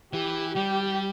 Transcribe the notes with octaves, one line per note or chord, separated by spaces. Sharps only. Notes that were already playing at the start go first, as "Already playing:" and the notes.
E3 G4
G3 G4